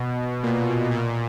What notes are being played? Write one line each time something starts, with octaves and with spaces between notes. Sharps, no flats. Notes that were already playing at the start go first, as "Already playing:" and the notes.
Already playing: B2
A#2
A#2